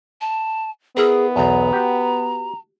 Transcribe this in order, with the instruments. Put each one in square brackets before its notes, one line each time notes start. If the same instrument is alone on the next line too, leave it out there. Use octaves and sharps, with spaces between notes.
[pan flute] A5
[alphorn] B3 [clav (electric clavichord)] E4 A#4 [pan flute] G#4
[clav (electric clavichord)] B1 E2 [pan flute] A#5
[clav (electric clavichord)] F#4 G4